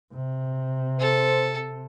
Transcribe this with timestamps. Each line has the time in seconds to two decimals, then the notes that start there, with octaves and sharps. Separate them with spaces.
0.14 C3
0.99 A4 C5